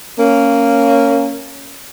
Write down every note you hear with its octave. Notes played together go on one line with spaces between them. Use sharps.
A#3 C#4